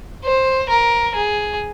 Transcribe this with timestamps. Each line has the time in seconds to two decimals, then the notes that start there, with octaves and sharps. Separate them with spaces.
0.25 C5
0.69 A#4
1.15 G#4